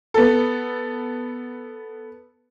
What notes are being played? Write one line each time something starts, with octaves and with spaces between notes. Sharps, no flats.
B3 A4